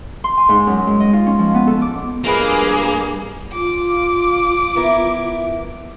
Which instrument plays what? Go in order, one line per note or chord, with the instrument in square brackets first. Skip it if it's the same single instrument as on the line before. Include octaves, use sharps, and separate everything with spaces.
[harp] C6
G#5
G#2
F#2
G#3
D#5
F4
C#4
F3
B3
A4
D6
[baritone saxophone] G2 [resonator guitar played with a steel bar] F3 G#3 B4 [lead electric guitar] A#3 [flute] G#4
[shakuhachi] F4 [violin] D6
[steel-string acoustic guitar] B3 E4 A#4